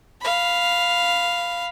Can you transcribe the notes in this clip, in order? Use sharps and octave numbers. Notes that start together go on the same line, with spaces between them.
F5 B5